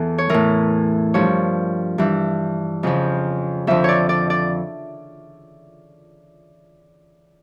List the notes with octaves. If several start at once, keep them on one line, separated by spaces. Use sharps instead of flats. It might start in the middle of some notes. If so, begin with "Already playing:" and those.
Already playing: E2 E3 A4
C#5
A2 E3 A#4
G2 F3 C#5
G2 E3
F2 C#3 F3
F2 D3 F3 E5
C#5 D5
D5
D5